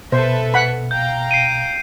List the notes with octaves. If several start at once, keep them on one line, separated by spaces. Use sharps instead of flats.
B2 A4 B4 C5 E5
F#5 B5
F5 G5 A#5 G6
C7 D7 D#7